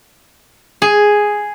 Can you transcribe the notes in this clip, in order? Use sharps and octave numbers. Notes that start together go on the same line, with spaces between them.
G#4